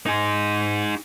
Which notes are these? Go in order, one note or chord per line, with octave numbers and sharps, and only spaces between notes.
D#4 G#4